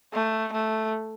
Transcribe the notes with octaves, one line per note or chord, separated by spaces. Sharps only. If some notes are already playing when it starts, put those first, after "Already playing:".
A3
A3